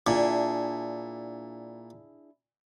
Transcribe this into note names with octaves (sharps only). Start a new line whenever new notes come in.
A#2 D4 E4 G#4